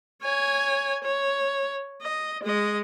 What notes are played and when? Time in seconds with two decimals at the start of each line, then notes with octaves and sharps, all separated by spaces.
0.22 C#5 G#5
1.04 C#5
2.02 D#5
2.43 G#3 D#5